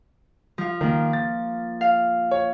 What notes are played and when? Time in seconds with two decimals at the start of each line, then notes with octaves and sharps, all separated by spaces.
0.58 F3 F5
0.81 D#3 A#3 F4
1.13 A6
1.81 F5
2.31 C#5